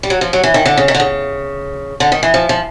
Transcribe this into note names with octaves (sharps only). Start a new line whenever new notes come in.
G3
F#3
F3
F#3
E3
D#3
D3
C#3
D#3
D3
C#3
D3
D#3
E3
F3
F3